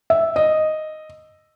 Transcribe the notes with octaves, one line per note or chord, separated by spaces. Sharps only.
E5
D#5